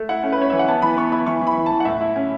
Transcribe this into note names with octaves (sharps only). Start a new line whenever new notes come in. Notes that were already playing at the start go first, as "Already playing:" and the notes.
Already playing: A3
E4 F#5
C#4
B4
C#4 C#5
E3 E5
F#5
B3 A5
E3 B5
B3 C#6
E4 B5
E3 C#6
E3
B5
E3
A5
E3
F#5
A2 E5
E4
C#4